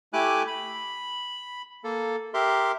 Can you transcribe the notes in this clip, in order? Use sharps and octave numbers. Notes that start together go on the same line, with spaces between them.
A3 E4 G4 G#5 D6 F#6
B5
A#3 A4
G4 A#4 E5 C6